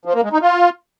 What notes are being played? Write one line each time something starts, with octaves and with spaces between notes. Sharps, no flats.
F3
A#3
G#3
D#4
F4